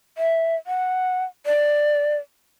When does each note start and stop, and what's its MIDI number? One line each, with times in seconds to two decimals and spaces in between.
0.18 0.56 76
0.67 1.24 78
1.46 2.17 74